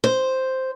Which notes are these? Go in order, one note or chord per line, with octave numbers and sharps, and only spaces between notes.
C5